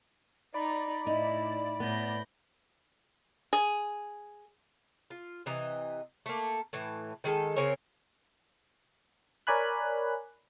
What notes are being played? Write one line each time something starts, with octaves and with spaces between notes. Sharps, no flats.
D#4 D5 A#5 B5
A2 D#4 E4
A2 B3 G6 A#6
G#4
F4
C3 E3 D#5 A#5
A3 A#3
A2 E3
D#3 G#3 G#4 A4
C#3 C4 A#4 C#5
A#4 C#5 D5 G#5 B5 F#6